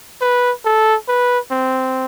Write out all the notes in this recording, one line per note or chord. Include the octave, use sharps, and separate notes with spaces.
B4
A4
B4
C4